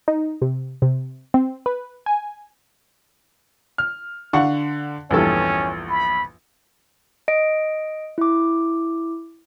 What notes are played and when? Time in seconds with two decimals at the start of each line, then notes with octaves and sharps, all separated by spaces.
0.08 D#4
0.42 C3
0.82 C3
1.34 C4
1.66 B4
2.06 G#5
3.78 F6
4.33 D3 F5 F#5 C#6
5.11 A#1 E2 G2 C#4 A4
5.89 B5
7.28 D#5 D7
8.18 E4 D6